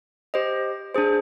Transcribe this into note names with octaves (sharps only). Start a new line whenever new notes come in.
G4 C5 D#5
D4 G#4 C5